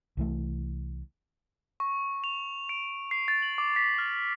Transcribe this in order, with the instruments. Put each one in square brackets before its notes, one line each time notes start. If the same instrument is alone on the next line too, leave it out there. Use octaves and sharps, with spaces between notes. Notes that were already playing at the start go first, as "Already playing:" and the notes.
[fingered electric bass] C2 E3 A3
[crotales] C#6
F7
D7
C7
A6
F#7
D6
B6
F6